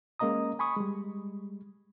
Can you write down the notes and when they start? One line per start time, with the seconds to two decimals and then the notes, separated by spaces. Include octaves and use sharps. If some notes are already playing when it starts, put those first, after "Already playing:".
0.19 G#3 A#3 C#4 D#5 A#5 D#6
0.59 G#5 B5 C#6 D#6
0.77 G3 G#3